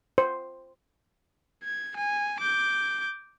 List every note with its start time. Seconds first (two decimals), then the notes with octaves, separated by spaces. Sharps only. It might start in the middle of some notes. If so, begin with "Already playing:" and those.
0.18 C5
1.64 G#6
1.96 G#5
2.40 D6 G6